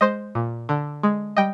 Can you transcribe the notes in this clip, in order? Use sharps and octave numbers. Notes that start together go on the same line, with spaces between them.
G#3 C5 D#5
A#2
D3
G#3
G3 D#5 G5